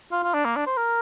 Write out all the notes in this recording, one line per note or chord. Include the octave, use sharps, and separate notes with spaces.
F4
F4
D4
A#3
D4
C5
A#4